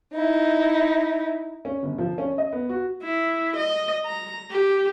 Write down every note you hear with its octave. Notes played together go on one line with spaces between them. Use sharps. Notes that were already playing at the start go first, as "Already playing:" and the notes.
D#4 E4
C#4
G1
F3
C#4
D#5
B3
F#4
E4
D#5
A#5
G4